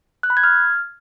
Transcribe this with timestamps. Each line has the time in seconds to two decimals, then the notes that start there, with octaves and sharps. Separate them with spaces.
0.23 F#6
0.30 B5
0.37 G#6
0.43 F6